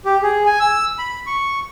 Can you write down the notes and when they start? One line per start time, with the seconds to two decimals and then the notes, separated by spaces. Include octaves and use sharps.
0.05 G4
0.22 G#4
0.46 G#5
0.60 E6
0.99 B5
1.27 C#6